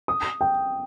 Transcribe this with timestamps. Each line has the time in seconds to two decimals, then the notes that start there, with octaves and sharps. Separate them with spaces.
0.08 D#6
0.41 G5